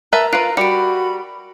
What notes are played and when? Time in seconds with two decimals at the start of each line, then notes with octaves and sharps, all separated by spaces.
0.13 A#4 B4 E5 A5 A#5
0.33 F4 A#4 B4 F#6 C7 D7
0.57 G3 F#4 B5 C#7 D7